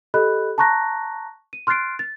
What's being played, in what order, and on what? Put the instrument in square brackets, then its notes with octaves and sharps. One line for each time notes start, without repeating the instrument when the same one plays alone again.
[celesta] G4 A4 D#5 B5 F#6
A5 A#5 C#6 F#6 A#6
D#7
C6 F6 F#6 A6 C7 D7
A6